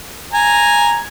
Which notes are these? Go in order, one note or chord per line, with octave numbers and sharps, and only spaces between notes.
G#5 A#5